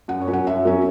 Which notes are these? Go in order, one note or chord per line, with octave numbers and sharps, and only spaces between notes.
F#2 F#5
C#5
F#3 C#4
F#5
F#2 E5
F#3 C#4